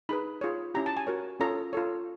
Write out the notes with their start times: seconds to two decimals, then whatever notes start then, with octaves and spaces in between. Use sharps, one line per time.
0.09 D#4 G#4 B4 B5
0.41 F4 G#4 C#5
0.74 C#4 E4 G4 A#5
0.86 A5
0.97 G#5
1.07 F#4 A#4 C#5
1.40 C#4 F4 A4 C#5 A#5
1.73 F4 A4 C#5